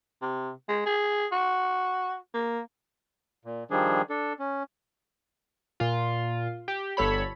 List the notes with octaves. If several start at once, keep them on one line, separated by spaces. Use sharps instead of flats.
C3
G#3
G#4
F#4
A#3
A#2
D#3 F3 G3 D4 G#4
D4 A4
C#4
A#2 F4
G4
G1 A4 C#5 B5